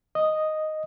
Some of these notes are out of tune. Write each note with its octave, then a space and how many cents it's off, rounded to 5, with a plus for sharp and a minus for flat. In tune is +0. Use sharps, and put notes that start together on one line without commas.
D#5 +0 D#6 -5